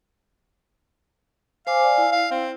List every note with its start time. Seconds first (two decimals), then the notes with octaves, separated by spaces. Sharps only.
1.67 C5 F5 G#5 D6
1.84 D5 G#5
1.98 E4
2.12 F5
2.31 C4